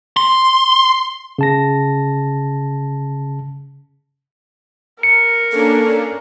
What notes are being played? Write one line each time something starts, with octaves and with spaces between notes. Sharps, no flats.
C6
C#3 A5 A#6
A#4 C#7
A#3 C#4 D4 A4